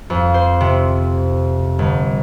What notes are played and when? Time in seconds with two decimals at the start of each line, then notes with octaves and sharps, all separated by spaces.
0.10 F2
0.34 C5
0.61 C3
1.79 G1